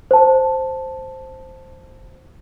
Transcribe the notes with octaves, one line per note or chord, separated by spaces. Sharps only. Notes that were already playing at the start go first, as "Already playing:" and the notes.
C5 A5